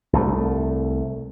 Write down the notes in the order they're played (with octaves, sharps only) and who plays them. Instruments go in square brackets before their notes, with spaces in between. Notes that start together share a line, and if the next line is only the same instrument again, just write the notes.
[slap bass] C2 A3